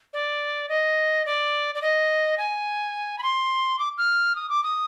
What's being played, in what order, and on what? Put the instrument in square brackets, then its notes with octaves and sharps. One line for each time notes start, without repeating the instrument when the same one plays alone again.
[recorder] D5
D#5
D5
D5
D#5
G#5
B5
C6
D6
F6
D#6
D6
D#6